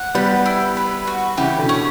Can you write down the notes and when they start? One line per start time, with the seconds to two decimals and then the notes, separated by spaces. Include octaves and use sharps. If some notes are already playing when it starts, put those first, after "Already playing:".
Already playing: F#5
0.15 G3 B3 G4
0.46 E4
0.77 B4
1.07 F#4
1.38 C#3 E3 G4
1.58 B2 D3
1.69 C#4